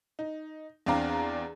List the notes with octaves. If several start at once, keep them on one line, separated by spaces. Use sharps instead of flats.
D#4
E2 C4 D4 D5 F5 A#5